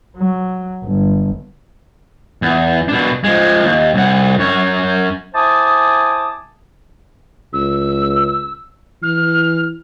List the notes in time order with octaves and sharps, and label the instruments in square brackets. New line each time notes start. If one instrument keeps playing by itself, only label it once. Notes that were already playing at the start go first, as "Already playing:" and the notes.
[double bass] F#3
G1
[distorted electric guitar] E2
B2 D4
F3 G#3
D#2
C2 F#5
F#2 C#5
[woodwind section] E4 C5 G#5 A5 D6 D#6
[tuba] C#2 [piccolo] E6
[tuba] E3 [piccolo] F6